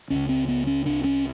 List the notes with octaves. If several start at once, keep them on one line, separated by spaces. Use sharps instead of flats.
C#2 C#3 C#4
C4
B3
C#4
C2 C3 D4
C#4